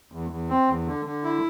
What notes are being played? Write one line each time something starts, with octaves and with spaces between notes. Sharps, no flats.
E2
E2
C4
E2
D3
D3
E4